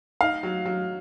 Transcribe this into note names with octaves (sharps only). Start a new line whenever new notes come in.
D#4 F5
F#3
F#3